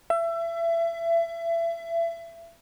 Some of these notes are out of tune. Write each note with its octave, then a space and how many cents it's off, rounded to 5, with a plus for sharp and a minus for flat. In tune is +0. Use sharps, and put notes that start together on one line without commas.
E5 +30